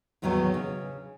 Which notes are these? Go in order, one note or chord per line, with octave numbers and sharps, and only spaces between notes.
E2 A2 D#3 F#3 A3 B3
C#3